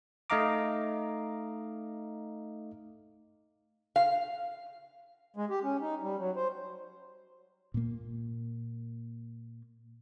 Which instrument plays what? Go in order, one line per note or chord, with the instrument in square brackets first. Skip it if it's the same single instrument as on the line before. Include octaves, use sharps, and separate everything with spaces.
[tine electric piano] A3 D#4 D#5 F5 A#5 D6
[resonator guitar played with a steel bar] F5
[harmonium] G#3
G4
C#4
D#4
G3
F#3
C5
[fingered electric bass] A#2 A#3